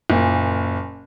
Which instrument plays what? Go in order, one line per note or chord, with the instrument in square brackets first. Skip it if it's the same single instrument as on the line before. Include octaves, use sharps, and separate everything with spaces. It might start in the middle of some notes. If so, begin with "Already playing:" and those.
[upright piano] F#1 A#2